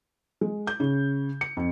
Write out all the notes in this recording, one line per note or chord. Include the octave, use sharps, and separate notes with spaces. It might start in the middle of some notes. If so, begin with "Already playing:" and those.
G#3
G6
C#3
C#7
F2